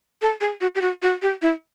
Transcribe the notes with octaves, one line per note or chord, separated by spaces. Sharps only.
A4
G#4
F#4
G4
F#4
F#4
G4
E4